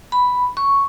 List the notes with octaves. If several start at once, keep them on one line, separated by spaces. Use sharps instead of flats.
B5
C#6